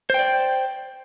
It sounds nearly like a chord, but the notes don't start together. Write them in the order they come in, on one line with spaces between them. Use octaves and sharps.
C5 G5 D5